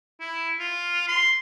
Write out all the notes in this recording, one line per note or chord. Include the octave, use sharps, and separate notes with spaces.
E4
F4
C6